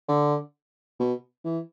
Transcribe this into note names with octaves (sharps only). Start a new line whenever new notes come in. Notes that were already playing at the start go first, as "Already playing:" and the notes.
D3
B2
E3